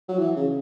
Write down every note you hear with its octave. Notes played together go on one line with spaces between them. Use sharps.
F#3
E3
C#3